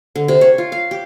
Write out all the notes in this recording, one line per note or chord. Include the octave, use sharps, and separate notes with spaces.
D3
C3
C#5
F4
F5
G4